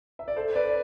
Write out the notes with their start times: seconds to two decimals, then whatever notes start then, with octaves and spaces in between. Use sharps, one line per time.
0.19 E5
0.28 D5
0.36 A4 C5
0.56 B4 D5